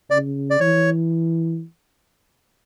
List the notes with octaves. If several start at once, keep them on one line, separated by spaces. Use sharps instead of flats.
C#3 D5
D5
E3 C#5